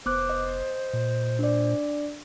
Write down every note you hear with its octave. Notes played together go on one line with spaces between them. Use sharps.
F1 B3 C5 D6 F#6
D#5
A#2
D4 D5